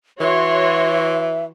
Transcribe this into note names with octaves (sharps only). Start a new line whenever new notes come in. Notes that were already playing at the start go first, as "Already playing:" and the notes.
E3 F#4 C#5 E5 C6